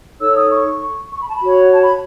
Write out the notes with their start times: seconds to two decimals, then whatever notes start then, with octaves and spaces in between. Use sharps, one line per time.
0.20 D#4 A4 C#5 E6
0.35 D#6
0.51 C#6
1.12 C#6
1.20 B5
1.27 A5
1.36 B5
1.43 F#4 C#5
1.73 A5
1.82 B5